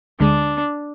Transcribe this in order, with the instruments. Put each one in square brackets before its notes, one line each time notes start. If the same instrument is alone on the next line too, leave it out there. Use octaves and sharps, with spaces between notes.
[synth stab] D2 D3 G#3 [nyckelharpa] D4